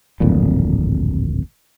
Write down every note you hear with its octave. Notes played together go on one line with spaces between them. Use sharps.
D1 G#1 F2 A#2